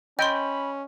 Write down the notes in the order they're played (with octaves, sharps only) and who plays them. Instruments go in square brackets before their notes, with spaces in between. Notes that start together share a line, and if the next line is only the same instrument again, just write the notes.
[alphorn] C#4 [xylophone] D#5 C6 [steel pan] G5 [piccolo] B5